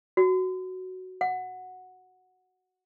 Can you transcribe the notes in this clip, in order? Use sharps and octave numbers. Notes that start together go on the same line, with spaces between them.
F#4
F#5